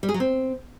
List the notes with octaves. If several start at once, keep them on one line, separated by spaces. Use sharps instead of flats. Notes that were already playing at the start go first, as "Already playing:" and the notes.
G3
G#4
F#3
C4